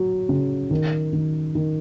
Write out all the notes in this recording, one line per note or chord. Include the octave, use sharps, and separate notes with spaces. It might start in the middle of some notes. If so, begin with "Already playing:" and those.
Already playing: F#3
C#3
D#3
D#3
D#3